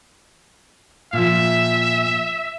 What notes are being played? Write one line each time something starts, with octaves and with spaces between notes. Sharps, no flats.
A#2 F3 E5